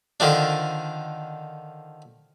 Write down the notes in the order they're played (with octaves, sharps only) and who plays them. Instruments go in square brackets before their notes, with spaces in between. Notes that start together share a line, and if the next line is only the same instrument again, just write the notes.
[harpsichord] D3 D#3 F3 D4